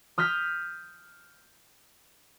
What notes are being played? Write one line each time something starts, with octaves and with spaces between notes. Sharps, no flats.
D#6 F6 G6 B6